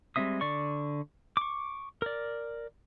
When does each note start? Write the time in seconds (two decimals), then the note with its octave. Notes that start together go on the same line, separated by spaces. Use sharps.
0.16 G3 G#3 C4 E5 D#6
0.41 D3 D5 C#6
1.37 C#6 D6
2.02 A#4 D5